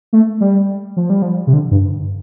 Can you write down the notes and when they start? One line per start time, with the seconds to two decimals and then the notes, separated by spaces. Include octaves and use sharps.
0.13 A3
0.41 G3
0.97 F3
1.10 G3
1.22 F3
1.47 C3
1.53 D3
1.71 G2